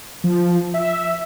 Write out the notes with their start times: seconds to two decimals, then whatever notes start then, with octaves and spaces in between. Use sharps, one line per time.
0.24 F3
0.74 E5